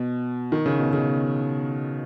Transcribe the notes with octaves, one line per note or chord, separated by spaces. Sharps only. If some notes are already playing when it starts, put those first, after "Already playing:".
Already playing: B2
D#3
C#3
B2
C#3